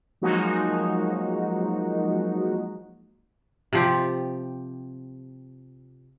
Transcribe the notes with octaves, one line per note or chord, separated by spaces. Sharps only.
F3 F#3 G#3 A#3 D#4 F#4
C3 F3 G4